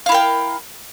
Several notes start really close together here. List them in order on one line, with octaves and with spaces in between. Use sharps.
F5 E4 A#4 G5